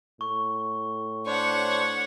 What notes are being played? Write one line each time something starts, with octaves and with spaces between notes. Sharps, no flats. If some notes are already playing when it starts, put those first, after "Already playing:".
A2 C#6
D4 C5 C#5 F#5